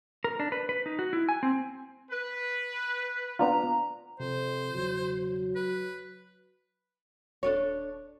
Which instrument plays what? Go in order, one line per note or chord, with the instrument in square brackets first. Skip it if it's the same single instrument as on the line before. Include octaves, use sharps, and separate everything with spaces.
[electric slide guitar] A#4
D4
B4
B4
D#4
F#4
E4
G#5
C4
[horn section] B4
[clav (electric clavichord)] B3 D4 F4 [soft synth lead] A#5
[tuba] F2 [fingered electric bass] C3 [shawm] C5
[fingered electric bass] E1 C#3 [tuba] F#3
[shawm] B4
[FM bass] D#1 [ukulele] D4 A4 C#5